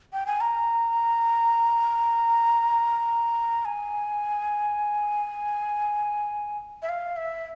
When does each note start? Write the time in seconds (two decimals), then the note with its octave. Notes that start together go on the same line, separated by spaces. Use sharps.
0.13 G5
0.27 G#5
0.41 A#5
3.65 G#5
6.82 E5
6.89 F5
7.17 E5